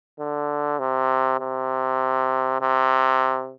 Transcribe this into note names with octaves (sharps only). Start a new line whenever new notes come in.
D3
C3
C3
C3